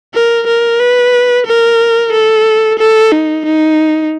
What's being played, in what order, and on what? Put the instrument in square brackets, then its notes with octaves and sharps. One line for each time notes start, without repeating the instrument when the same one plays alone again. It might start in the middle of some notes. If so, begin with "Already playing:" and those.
[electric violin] A#4
A#4
B4
A#4
A4
A4
D#4
D#4